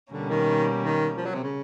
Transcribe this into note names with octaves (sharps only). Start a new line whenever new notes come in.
B2 D3 G3 A#3 C#4
D#3
D#3
F3
F#3
C3
C#3